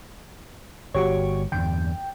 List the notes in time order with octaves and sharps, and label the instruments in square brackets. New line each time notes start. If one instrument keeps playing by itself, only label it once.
[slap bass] G1 [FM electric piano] F#4 G4 C#5
[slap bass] E2 G2 D3 [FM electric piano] G5